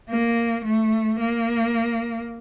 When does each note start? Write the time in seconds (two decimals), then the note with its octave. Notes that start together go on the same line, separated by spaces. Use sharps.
0.10 A#3
0.65 A3
1.20 A#3